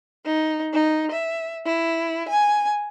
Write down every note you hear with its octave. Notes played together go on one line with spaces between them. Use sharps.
D#4
D#4
E5
E4
G#5